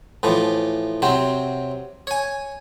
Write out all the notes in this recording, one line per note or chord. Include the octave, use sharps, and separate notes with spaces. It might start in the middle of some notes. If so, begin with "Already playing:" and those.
A2 E3 F3
C3 F#3 C4
C#5 G#5